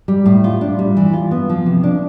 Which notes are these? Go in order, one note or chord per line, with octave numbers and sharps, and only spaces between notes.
G3
A2
F4
D4
G3
E3
F4
B3
F3
C3
D4